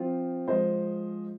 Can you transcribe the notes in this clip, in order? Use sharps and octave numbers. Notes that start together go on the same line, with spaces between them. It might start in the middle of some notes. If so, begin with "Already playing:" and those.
Already playing: F3 C4 F4
F3 G#3 F4 C5 D#5